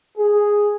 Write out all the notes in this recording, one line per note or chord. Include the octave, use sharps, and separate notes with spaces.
G#4